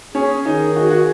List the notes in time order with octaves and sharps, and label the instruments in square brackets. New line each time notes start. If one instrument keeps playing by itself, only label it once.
[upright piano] C#4 [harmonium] G#4
[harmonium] D#3 [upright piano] D#4
[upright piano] F#4 [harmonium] G#4
[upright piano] F#4